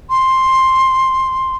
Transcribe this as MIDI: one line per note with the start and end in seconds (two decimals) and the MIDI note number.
0.10 1.56 84